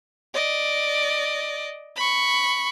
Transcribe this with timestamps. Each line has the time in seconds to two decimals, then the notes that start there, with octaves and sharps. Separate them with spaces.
0.34 D5 D#5
1.96 B5 C#6